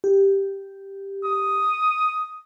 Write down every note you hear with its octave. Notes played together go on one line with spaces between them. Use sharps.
G4
D#6